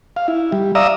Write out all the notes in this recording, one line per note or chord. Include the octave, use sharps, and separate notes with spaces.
F5
E4
G3
D5 E5 F5 A#5 D#6 E6